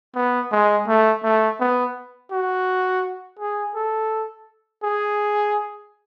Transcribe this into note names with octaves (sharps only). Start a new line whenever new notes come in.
B3
G#3
A3
A3
B3
F#4
G#4
A4
G#4